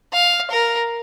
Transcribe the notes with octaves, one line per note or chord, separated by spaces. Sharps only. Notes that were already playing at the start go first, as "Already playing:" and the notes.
F5
A#4